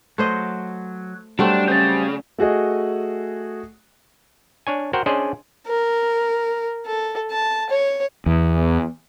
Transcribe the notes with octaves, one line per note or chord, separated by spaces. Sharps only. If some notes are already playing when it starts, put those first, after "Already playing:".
F#3 A3 C5 D#5
F#3 G3 A3 C4 D4
C#3 C5 D5
A3 F#4 G#4 D#5
D4 C#5 G#5
F#4 A#4 C5 F#5 G5
C#4 D4 G#4 C5 D5 D#5
A#4
A4
A5
C#5
E2